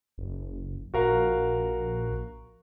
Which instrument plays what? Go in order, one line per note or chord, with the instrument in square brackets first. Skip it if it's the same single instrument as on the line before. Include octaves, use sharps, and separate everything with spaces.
[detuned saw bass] F#1
[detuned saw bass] A#1 [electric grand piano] F#4 A#4 F5